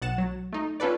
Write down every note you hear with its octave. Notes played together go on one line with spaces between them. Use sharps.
B1 F#5 A6 E7
F#3
A3 D#4
C#4 F4 A4 B4 D5